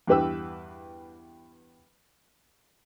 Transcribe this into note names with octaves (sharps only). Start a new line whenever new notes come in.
E2 G2 G4 B4 G5 E6